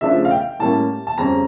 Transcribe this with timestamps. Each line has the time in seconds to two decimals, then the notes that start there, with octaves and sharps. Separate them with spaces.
0.01 C#3 F3 A3 D4 F4 E5
0.25 F5
0.31 G5
0.59 A2 G3 A#3 C#4 A5
1.07 A5
1.18 F2 C#3 G3 C#4 A#5